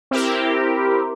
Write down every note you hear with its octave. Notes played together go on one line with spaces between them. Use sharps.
C4 E4 G4 A#4